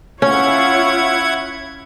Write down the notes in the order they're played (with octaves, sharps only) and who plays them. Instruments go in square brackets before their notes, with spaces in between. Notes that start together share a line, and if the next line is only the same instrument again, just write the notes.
[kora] C#4 [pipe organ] E4 F#5 G#6 [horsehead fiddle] F4 C#5